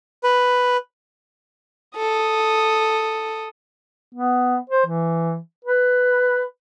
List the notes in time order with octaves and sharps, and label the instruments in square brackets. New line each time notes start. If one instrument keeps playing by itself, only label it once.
[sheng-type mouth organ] B4
[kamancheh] A4 D#6
[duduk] B3
C5
E3
B4